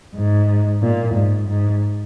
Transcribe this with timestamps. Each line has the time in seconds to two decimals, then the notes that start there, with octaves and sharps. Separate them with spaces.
0.14 G#2
0.81 A#2
1.14 G#2
1.47 G#2